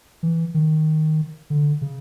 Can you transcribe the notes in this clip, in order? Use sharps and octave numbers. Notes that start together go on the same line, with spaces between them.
E3
D#3
D3
C#3